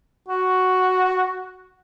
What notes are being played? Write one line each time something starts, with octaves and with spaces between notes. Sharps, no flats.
F#4